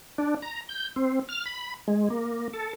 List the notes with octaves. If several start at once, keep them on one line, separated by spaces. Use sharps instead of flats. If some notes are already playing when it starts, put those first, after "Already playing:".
D4
A#5
G6
C4
F6
B5
G#3
A#3
A4